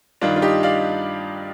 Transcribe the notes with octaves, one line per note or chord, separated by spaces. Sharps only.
G2 D#3 D4 F4
F4
D#4 G4
D5 F5